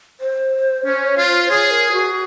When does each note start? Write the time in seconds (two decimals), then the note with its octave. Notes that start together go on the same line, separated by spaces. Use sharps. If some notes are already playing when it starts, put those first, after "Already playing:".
0.20 C5
0.85 C#4 C5
1.07 C#5
1.17 F4
1.28 C5
1.44 C5
1.49 G#4 C#5
1.71 A#4
1.92 F#4